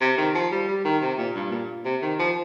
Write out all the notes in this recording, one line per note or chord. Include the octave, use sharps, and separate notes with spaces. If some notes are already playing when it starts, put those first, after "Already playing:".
C3
D#3
F3
G3
G3
D#3
C3
A#2
G2
A#2
C3
D#3
F3